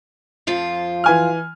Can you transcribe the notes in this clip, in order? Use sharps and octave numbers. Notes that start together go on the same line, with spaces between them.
F2 F3 F4
E3 G#5 F6